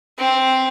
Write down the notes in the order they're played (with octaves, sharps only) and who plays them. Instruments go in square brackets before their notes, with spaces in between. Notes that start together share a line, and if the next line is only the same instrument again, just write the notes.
[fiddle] C4